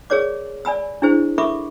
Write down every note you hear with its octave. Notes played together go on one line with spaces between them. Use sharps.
G#4 A#4 C#5 D5 D6
D5 G#5 B5 E6
D4 E4 G#4 C5
A4 A#4 E5 B5 C#6 D6